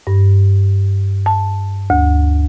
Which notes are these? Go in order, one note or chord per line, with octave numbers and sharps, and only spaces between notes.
G2
A5
D2